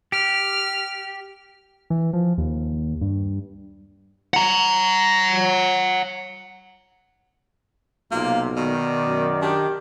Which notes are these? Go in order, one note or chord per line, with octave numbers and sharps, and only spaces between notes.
G4 F6
E3
F3
D#2
G2
F#5 A#5
B1 C3 A#3 F4
B2 D#3 D5
F#2
D4 G4